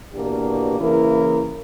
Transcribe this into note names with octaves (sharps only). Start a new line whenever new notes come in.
E2 B2 A#3 D4 G4
C#3 E3 A#3 E4 A#4